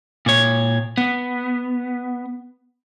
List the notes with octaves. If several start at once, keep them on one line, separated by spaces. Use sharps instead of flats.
A#2 C#5
B3